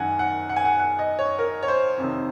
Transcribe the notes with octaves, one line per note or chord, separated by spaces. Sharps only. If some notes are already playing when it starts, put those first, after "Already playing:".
Already playing: F#2 D#3 F#5 G#5
F#5
F#5
G#5
F#5
F#5
D#5
C#5
A#4
C#5
C5
F2 C3 D#3